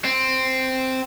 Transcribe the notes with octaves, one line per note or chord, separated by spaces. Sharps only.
C4